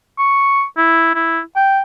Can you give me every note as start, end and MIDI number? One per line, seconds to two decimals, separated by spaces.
0.18 0.64 85
0.77 1.12 64
1.15 1.40 64
1.56 1.82 79